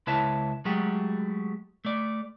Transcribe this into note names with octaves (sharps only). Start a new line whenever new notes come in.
C#2 E4 B4 C#5 E5 A5
F#3 G#3 A3 F#4 G4
A3 D5